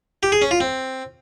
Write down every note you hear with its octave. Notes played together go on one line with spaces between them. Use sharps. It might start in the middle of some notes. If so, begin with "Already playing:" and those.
G4
G#4
C#4
F4
C4